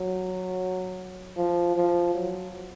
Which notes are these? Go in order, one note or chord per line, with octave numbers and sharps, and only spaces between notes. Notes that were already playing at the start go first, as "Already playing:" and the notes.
Already playing: F#3
F3
F3
F#3